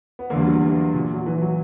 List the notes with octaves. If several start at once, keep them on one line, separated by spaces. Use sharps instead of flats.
B3
E2 D3 A#3
G3
F#3
E3
A#2
F#3
E3
F#3